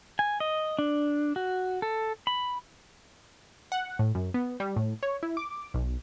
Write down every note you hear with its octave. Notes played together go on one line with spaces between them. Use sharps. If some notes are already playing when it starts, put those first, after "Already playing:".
G#5
D#5
D4
F#4
A4
B5
F#5
A2
F#2
B3
G3
A2
C#5
E4
D6
B1